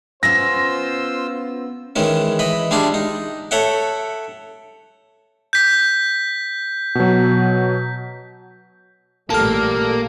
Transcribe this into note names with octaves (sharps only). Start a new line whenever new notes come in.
B3 C#4 F4 C5 F5 E6 A#6
D#3 E3 G#3 C#4
E3 D#5 B5
G3 G#3 D4 E4 F4
D#4
A4 C#5 E5 F#5 G5
G6 B6
B2 F#3
A1 A#2 G3 A#3 G4 A4 A5 F6